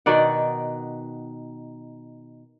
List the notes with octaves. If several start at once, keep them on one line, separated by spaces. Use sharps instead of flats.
B2 D#3 D5 F#5